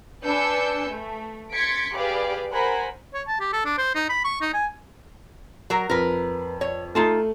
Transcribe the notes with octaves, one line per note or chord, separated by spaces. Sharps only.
D4 B4 G#5 E6 G6 C#7
A3
C6 G#6 A6 B6 C#7 D7
G4 G#4 B4 D5 F5 B5
A#4 C5 F#5 G#5 B5
C#5
A5
G4
A4
D4
C5
D#4
B5
C#6
D#4
G#5
F#3 A#4 A#5
F2 A#4 B4
C#5
A3 D#4 F4 A5